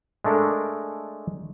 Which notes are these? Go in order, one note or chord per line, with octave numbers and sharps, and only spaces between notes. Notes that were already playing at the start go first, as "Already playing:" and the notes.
G#3 A3 D4 A4 A#4